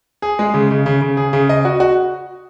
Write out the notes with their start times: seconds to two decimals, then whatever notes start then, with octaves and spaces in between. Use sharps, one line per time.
0.22 G#4
0.39 G#3
0.54 C#3
0.71 C#3
0.86 C#3
1.01 C#3
1.17 G#4
1.33 C#3
1.49 D#5
1.65 F#4
1.80 F#4